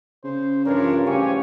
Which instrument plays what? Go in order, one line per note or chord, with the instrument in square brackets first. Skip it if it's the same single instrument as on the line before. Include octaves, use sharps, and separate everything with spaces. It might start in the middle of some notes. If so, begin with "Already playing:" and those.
[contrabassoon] C#3 [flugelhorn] C5
[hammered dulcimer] G2 E3 F3 [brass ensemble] D4 B4 C#5 [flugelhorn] A#4
[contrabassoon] C#3 [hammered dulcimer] G3 A3 F#4 [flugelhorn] G4 [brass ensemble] C5 C#5 G#5